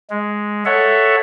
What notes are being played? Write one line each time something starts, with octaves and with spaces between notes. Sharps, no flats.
G#3
A4 C#5 E5 F#5